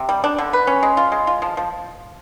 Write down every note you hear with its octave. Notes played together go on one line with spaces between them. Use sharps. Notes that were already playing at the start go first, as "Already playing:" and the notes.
Already playing: C3
G3
D4
D3
B4
C#4
G#3
F4
G#3
F4
F3
F3